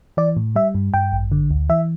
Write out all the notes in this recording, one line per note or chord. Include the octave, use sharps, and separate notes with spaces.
E3 D5
A2
G3 E5
G2
G2 G5
A1
D3
D2
E3 E5